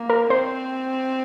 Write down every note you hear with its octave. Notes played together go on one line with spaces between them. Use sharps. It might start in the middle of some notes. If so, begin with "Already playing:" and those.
Already playing: A#3
A#4
C4 C5